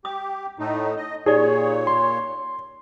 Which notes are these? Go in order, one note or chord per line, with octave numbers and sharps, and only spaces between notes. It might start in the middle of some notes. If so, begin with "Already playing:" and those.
G4 D#6
A2 A3 D#4
D#5
A#2 D#4 G4 G#4 C#5 D5
C6